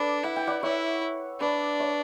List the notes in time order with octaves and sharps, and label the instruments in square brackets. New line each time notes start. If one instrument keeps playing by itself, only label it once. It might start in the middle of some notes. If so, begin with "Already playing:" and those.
Already playing: [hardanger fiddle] D4 [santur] A4 B4 D5
[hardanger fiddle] E4 [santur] F#5
[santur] G5
D5 F#5
[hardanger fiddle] E4 [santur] C#5 E5
[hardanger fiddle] D4 [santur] B4 D5
[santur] C#5 E5